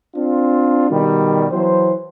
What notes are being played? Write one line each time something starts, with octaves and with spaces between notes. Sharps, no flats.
C4 D4 F4
B2 D#3 G3
E3 F#3 C5